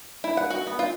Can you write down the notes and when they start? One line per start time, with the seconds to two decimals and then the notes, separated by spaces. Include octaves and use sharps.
0.24 E4
0.37 F#5
0.50 F#4
0.67 B3
0.79 F4